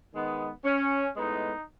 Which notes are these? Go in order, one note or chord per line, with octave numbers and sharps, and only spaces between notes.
D#3 G#3 B3
C#4
A2 G#3 B3 D#4